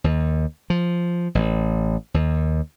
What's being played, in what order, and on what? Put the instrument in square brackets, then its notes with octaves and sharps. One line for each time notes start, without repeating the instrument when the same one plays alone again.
[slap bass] D#2
F3
A1
D#2